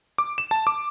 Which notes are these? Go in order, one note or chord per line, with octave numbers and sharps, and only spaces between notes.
D6
E7
A5
D6